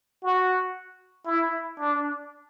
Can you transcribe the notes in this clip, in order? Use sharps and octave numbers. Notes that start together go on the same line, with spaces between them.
F#4
E4
D4